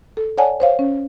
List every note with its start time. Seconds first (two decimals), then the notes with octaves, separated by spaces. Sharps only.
0.17 A4
0.38 C#5 D5 F#5 G#5 A5
0.60 C5 C#5 F5
0.79 C#4